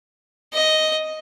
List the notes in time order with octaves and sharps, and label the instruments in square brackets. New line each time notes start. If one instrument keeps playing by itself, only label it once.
[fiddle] D#5